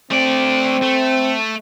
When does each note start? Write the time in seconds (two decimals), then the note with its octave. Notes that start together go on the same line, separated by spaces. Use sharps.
0.11 A3 C4 D5
0.83 A3